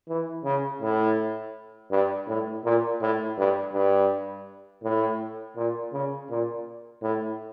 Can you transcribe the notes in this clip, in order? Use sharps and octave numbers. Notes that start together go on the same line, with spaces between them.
E3
C#3
A2
G2
A2
A#2
A2
G2
G2
A2
A#2
C#3
A#2
A2